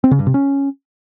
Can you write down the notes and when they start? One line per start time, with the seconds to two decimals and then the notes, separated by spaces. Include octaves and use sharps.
0.04 C4
0.11 C#3
0.19 G2
0.27 C3
0.34 C#4